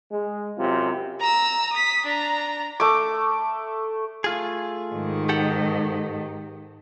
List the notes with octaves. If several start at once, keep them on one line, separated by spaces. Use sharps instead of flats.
G#3
F#2 C3 F4
A#5 E6
D#6 B6
D4 A#5
A3 D6
A3 F4 G#4
G#2 D#3
G4 A4 F#5